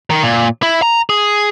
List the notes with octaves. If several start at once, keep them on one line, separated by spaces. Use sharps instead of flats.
D#3
A#2
E4
A#5
G#4